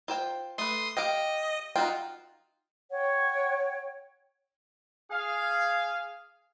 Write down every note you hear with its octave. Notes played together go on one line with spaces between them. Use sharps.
F4 C5 G5
A3 B4 C6 D#6
G4 D#5 F5 G5
D#4 F4 F#4 G5
C#5 F#5 G5
G#4 F5